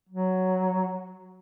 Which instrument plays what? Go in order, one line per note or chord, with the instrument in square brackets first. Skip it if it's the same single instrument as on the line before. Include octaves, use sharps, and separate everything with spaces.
[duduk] F#3